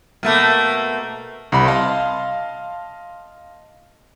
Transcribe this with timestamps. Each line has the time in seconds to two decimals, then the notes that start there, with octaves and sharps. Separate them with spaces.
0.23 B2 A3 A#3
1.52 C2 C3 B5
1.66 D#5 F5 A5 C6